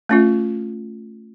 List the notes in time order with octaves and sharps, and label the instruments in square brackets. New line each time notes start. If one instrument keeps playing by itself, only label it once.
[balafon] A3 C#4 F4